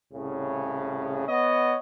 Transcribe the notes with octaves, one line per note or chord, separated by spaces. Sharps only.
C2 A2 C#3
B3 C#5 D#5 F#5